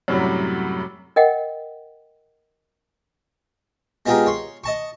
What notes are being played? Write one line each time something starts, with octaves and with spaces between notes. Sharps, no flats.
F#2 A2 C3 F#3 G3
A#4 D#5 F#5 G5
G#3 B3 F4 G4 G#4 A#4
C#5 C6
D#5 A5 C#6